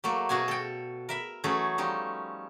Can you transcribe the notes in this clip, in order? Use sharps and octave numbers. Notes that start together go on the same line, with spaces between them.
F#3 A3 A#3 A4
B2 F#4 G#4 G#5
A4 G5
A#4 E5 B5
E3 F#3 A3 C#4 G#4 A4
F3 G3 D#4